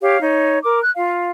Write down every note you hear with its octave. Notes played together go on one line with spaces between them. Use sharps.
G4 C#5 F5
D#4 C#5
A#4 D6
F#6
F4 F5